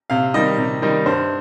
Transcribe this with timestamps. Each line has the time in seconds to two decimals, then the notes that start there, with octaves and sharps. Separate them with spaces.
0.10 C3 F5
0.34 D#3 G3 D#4 D#5
0.58 C3
0.82 D#3 G3 D#4
1.06 G2 C5